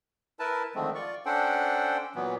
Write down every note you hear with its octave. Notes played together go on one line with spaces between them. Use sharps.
E4 A#4 B4 A5
D3 D#3 F3 G#3 A3 C4
F4 D5 C#6
C#4 D4 A4 C5 F#5 G5
A#2 E3 F#3 B3